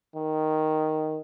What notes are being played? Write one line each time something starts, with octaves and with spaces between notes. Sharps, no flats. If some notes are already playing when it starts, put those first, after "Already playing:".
D#3